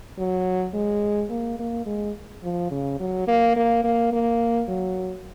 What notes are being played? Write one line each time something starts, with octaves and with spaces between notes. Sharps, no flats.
F#3
G#3
A#3
A#3
G#3
F3
C#3
F#3
A#3
A#3
A#3
A#3
F#3